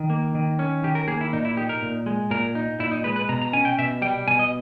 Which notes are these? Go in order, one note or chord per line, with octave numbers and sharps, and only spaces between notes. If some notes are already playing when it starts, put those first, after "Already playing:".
Already playing: D#3
A#3
D#3
C#4
D#3 G4
A#4
A#3 G#4
E4
A#2 D#4
E4
D#4 G4
A#4
A#2
G#3
A#2 A#4
D#4
A#2 E4
D#4
G#3 B4
B4
B2 A#5
A#5
C#4 G#5
G5
B2 E5
G3 G5
B2 G#5
D#5